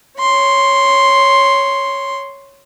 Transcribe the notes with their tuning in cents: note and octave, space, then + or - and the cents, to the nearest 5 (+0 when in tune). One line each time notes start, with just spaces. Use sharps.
C#5 +0 C6 +0